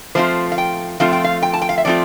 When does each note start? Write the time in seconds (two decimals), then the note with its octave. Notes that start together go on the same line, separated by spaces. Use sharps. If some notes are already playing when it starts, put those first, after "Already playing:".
0.15 F3 A3 C4 F4 C5
0.52 F5
0.58 G5
1.00 F3 A3 C4 F4 F5
1.13 G5
1.24 F5
1.42 G5
1.54 A5
1.62 G5
1.69 F5
1.78 E5
1.85 F3 A3 C4 F4 D5